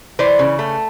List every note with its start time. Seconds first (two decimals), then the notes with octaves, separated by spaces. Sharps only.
0.19 E3 C5 D5
0.39 C#3
0.59 A3